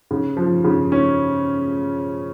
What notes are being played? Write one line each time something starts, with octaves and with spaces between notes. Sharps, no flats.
C#3
F3
C#3
C#4